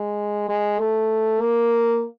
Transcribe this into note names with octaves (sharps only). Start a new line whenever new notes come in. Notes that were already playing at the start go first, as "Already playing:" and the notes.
Already playing: G#3
G#3
A3
A#3